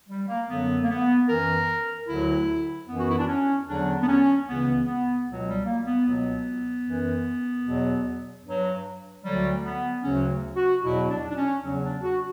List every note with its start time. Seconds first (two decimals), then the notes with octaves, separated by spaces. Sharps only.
0.09 G3
0.28 A#3
0.49 F#2 D3 F#3 B3
0.82 A#3
0.89 B3
1.29 F#2 E3 A#4
2.08 D2 D3 F#3 E4
2.87 F#2 B3
2.93 E3
3.00 F#4
3.09 E4
3.18 D4
3.27 C#4
3.67 E2 D3 F#3 D4
4.01 B3
4.07 C#4
4.46 C#2 C#3 E3 B3
4.86 B3
5.26 C#2 B2 F#3
5.46 G3
5.66 A#3
5.85 B3
6.05 C#2 B2 F#3 B3
6.85 F#2 E3
7.65 E2 B2 F#3
8.45 G2 F#3
9.24 D2 D3 F#3 G3
9.63 B3
10.03 D2 C#3 F#3 C#4
10.57 F#4
10.82 E2 B2 F#3 E4
11.10 D4
11.30 D4
11.36 C#4
11.63 E2 C#3 F#3 C#4
11.83 D4
12.02 F#4